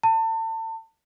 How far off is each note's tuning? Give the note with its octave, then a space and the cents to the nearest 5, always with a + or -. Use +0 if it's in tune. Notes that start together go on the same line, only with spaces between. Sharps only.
A5 +35